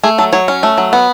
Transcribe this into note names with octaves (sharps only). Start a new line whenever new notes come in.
A3 G#4
F#3 A4
F#3 C#5
C#4
A3
F#3
B3